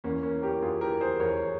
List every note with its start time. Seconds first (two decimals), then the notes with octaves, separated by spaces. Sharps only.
0.04 E2 A#3 C#4
0.09 E3
0.23 A#3 C#4
0.42 G4 A#4
0.62 E2 E3 F4 G#4
0.81 G4 A#4
1.01 G#4 C5
1.20 E2 E3 A#4 C#5